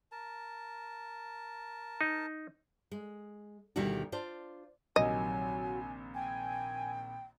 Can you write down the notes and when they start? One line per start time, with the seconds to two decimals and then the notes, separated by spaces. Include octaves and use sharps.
0.12 A#4 A5
2.01 D#4
2.91 G#3
3.76 D2 B2 D#3 G3 E4 F#4
4.12 D4 F4 C5
4.96 A#1 C3 D#3 F#3 D#5 G#5
6.15 G5 G#5